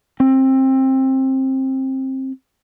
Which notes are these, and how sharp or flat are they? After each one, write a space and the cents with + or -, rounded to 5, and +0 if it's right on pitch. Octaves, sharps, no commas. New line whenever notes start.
C4 +20